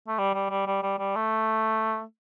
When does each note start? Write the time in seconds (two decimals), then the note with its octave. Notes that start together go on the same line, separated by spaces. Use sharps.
0.08 A3
0.18 G3
0.34 G3
0.50 G3
0.66 G3
0.83 G3
0.99 G3
1.15 A3